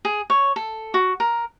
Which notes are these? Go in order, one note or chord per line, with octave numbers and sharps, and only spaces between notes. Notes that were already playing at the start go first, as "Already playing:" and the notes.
G#4
C#5
A4
F#4
A#4